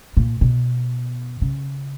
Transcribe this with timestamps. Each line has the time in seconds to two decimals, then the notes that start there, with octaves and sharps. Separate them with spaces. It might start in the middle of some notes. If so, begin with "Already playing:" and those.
0.17 A#2
0.41 B2
1.42 C#3